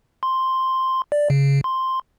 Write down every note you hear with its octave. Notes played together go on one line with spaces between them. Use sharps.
C6
D5
C#3
C6